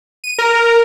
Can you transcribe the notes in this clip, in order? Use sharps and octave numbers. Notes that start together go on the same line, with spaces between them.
D#7
A#4